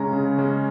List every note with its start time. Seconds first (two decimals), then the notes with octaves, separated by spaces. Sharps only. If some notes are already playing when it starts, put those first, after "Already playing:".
Already playing: C#3 G#3 C#4 A#5
0.13 C#3
0.38 G#3 C#4